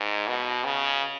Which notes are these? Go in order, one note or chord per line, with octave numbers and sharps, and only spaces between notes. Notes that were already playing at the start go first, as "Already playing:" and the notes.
Already playing: G#2
B2
C#3